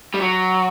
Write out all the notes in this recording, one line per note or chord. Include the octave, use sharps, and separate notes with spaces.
G3
F#3